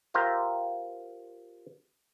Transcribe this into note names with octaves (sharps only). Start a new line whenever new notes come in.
F4 G4 A#4 C5 E5